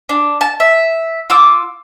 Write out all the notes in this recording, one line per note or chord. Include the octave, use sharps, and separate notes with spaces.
D4
A5
E5
F4 D6 E6